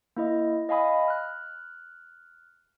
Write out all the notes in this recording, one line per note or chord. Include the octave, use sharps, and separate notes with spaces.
A#3 E4 D#5
D#5 F5 G#5 B5 D#6
F6 F#6